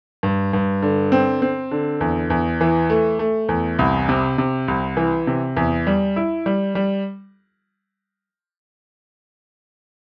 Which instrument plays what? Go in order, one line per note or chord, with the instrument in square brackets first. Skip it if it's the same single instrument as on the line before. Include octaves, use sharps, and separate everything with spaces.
[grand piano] G2
G2
D3
C4
C4
D3
E2
E2
E3
A3
A3
E2
C2
C3
C3
C2
E3
C3
E2
G3
E4
G3
G3